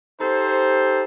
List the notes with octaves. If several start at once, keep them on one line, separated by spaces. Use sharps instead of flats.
D#4 G4 A4 C5